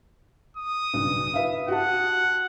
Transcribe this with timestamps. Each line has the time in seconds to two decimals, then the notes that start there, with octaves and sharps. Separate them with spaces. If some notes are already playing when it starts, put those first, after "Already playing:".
0.57 D#6
0.93 B1 G2 C#3
1.34 B4 E5 F5
1.68 F#4 G4 F#5 A5